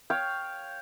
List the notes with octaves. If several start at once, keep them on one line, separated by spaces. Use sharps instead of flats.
C#5 F5 G5